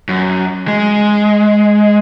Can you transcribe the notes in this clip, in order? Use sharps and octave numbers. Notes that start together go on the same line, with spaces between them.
F#2
G#3